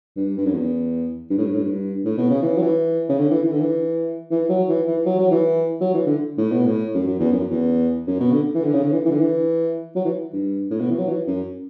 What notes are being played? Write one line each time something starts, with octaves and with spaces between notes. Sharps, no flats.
G2
G2
F#2
E2
G2
A2
G2
A2
G2
A2
B2
C#3
E3
F#3
E3
C#3
D3
E3
E3
D3
E3
E3
F#3
E3
E3
F#3
F#3
E3
F#3
E3
D3
A2
B2
A2
F#2
F#2
E2
F#2
E2
F#2
B2
D3
E3
D3
C#3
D3
E3
E3
D3
E3
F#3
E3
G2
A2
B2
E3
F#3
E3
F#2